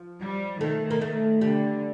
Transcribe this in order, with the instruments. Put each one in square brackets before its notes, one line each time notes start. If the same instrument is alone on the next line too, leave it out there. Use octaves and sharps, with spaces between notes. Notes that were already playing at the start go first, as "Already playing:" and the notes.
Already playing: [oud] F3
[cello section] G3
[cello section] D#3 [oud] A3
[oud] A#3
A3
[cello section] D3 [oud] G3